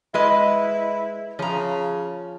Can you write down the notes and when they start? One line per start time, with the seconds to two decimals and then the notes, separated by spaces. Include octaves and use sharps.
0.14 G#3 E4 B4 D#5
1.39 C#3 F3 A#5